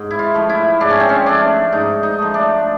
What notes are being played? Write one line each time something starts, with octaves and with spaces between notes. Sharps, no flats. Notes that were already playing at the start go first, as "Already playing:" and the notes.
Already playing: G#2
E4
F4
F3 A3
E4
G#2 D4
C#4
C4
C#4
F3 A3 D4
G#2 D#4
D#4
F3 A3
D4